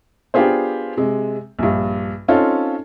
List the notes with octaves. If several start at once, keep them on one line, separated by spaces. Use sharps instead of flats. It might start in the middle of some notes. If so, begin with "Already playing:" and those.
B3 D4 F4 G4 G#4 C5
C3 G#3
A#1 G2
C4 C#4 D#4 F4 A4